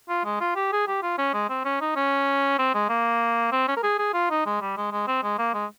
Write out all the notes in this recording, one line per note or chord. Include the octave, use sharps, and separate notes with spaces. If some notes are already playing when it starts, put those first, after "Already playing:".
F4
G#3
F4
G4
G#4
G4
F4
C#4
G#3
C4
C#4
D#4
C#4
C4
G#3
A#3
C4
C#4
A#4
G#4
G#4
F4
D#4
G#3
G3
G#3
G#3
C4
G#3
A#3
G#3